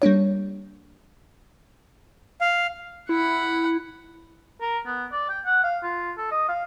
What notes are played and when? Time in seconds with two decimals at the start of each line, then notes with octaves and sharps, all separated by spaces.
0.02 G3 A#3 D4 C#5
2.41 F5
3.09 E4 F#5 B5
4.61 A#4
4.86 B3
5.12 D5
5.29 G5
5.45 F#5
5.64 F5
5.83 F4
6.18 A4
6.31 D#5
6.49 F5